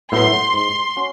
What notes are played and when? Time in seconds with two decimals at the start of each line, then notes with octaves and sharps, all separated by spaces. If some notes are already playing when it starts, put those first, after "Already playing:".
0.12 A2 F#3 B3 E4 C6
0.53 G#2 C6
0.97 C#4 F#4